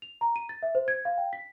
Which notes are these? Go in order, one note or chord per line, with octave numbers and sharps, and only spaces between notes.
F7
A#5
D#7
A6
E5
C5
G#6
F5
G5
B6